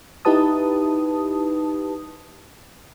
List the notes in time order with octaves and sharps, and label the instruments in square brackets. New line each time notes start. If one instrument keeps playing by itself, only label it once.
[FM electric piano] D#4 E4 G4 B4 A5 D#6